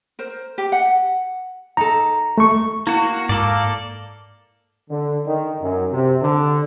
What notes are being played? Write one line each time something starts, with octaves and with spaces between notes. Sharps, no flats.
A#4 C5
G4
F#5
D#4 A4 A#5
A3 C#6
A#3 E4 F#4
G#2 A#3 A4 D5
D3
D#3
F#2
C3
D3